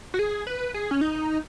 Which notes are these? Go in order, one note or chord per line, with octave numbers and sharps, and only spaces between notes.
F#4
G#4
B4
G#4
C#4
D#4